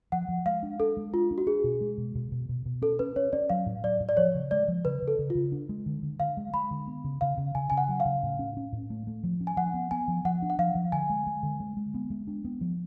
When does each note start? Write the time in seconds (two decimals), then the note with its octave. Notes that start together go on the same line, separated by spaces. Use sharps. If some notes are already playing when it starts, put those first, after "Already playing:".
0.12 F3 F#5
0.29 F3
0.46 G#3 F5
0.63 D4
0.80 D4 A4
0.97 G#3
1.13 D4 F4
1.31 D4
1.38 F#4
1.47 D4 G#4
1.64 B2
1.81 G#3
1.98 B2
2.15 B2
2.32 B2
2.49 B2
2.66 B2
2.82 C#4 A4
2.99 C#4 B4
3.16 C#4 C#5
3.33 C#4 D5
3.50 F#3 F5
3.66 A2
3.83 F#3 D5
4.00 A2
4.09 D5
4.17 F3 C#5
4.34 C#3
4.51 G#3 D5
4.68 F3
4.85 C#3 B4
5.02 C#3
5.08 A4
5.19 C#3
5.30 F4
5.35 C#3
5.52 D4
5.69 G#3
5.86 D3
6.03 D3
6.20 D3 F5
6.37 G#3
6.54 G#3 B5
6.71 D3
6.87 B3
7.04 C#3
7.21 C#3 F5
7.38 C#3
7.55 C#3 G#5
7.70 C#3 G#5
7.78 F#5
7.88 F#3
8.00 F5
8.05 C#3
8.23 A2
8.39 C#4
8.57 C#4
8.72 A2
8.90 A3
9.07 A3
9.24 F3
9.41 C#4
9.47 G#5
9.57 F3 F#5
9.74 B3
9.91 B3 G#5
10.08 F3
10.25 F3 F#5
10.42 D4
10.50 F#5
10.59 F3 F5
10.75 F3
10.92 D3 G#5
11.10 G#3
11.27 G#3
11.43 D3
11.60 G#3
11.77 G#3
11.94 B3
12.10 G#3
12.27 D4
12.45 B3
12.61 F3